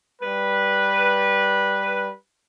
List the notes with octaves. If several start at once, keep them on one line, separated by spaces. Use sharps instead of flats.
G3 B4